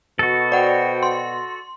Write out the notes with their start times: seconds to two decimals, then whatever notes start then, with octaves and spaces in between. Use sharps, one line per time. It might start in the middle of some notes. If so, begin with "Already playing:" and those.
0.19 B2 F#4 A4
0.52 C5 D5 F#5 G5
1.03 C6